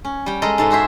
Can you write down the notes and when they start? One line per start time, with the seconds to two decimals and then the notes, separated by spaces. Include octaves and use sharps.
0.05 C#4
0.26 G3 G5
0.42 G#3 A4 A#4 D#5
0.58 G#2 A4 B4 C6
0.71 F#4 G#4 C5 E5